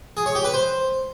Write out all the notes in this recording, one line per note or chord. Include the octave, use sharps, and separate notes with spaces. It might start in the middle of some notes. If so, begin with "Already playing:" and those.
G#4
C#5
G4
B4
C5